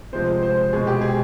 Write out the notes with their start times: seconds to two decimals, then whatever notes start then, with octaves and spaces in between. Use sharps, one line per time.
0.13 C3 F3 G#3 C5
0.43 C5
0.73 B2 G#3 G#4
0.87 G4
1.01 G#4